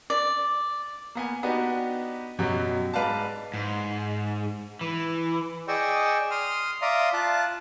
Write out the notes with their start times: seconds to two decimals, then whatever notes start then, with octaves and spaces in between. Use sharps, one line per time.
0.10 D5
1.15 A#3 B3 G#5
1.43 B3 D4 D#4 F#4 G4 B4
2.39 F#2 B2 F#3 G3
2.94 G#2 B4 D5 F5 A5
3.54 G#2
4.81 E3
5.68 G#4 D5 D#5 G5 C#6 E6
6.31 C6 D#6 F6
6.82 D5 E5 F5 A#5 C6 D#6
7.14 F4 A5 F#6